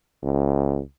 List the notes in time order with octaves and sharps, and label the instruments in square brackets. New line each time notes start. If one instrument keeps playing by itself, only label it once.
[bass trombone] C#2